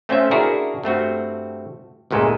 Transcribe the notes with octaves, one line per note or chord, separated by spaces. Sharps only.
A3 C4 C#4 F4 E5
D4 E4 F#4 G#4 A#4
G2 A3 C4 F#4
G1 D2 A#2 G#3 B3 A4